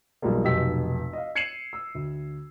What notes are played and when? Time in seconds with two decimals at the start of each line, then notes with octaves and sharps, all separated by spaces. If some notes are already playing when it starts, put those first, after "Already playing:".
0.22 B1 F3 G3 G#3 A#3
0.43 F1 B1 G4 E6 B6
1.13 D#5 F5
1.35 G#6 C7 C#7 D#7 E7 F#7
1.73 E6
1.95 D2